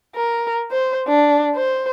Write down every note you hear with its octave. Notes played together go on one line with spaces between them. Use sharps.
A#4
C5
D4
C5